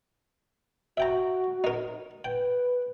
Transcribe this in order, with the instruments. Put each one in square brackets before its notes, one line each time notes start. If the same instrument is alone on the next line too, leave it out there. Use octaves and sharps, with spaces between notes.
[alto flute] F#4 [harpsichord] E5 G5 A#5
[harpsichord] D#4 A#4
[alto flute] B4 [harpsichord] G5